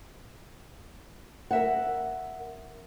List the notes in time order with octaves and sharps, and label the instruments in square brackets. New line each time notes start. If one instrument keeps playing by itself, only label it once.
[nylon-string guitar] A#4 E5 F#5